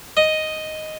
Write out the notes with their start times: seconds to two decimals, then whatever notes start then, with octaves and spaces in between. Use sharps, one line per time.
0.17 D#5